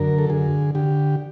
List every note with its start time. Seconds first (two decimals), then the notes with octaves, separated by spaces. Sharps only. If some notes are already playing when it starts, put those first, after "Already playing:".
Already playing: F#2 D3 A#4
0.18 A4
0.30 D3 G#4
0.75 D3 G4